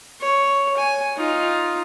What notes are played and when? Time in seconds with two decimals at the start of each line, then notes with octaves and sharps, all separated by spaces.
0.20 C#5
0.77 G#5
1.17 D#4 F4